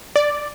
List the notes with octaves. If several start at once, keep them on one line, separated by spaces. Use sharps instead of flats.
D5